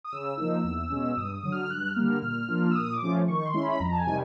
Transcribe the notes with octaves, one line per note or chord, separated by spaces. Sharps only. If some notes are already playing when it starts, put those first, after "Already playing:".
D#6
C#3 E6
F3 A#3 D#4
E2
B2 G#3 C#4
G2 D#6
D#6
D3 F#3
F6
G2 F#6
F6
D3 G3 A#3
F6
A#2 F6
F3 A#3 D4 F4
E6
A#2 D#6
D6
F3 A3 C#4 F4
D#3 C#6
C6
G#3 C#4 E4
B5
F2 A#5
A5
G#5
C3 D#3 G3